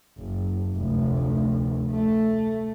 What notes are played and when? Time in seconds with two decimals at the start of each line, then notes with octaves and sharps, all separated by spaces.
0.19 F#1
0.76 F1 D2
1.91 A3